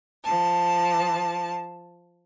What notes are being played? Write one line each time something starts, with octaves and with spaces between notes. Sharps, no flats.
F3 A5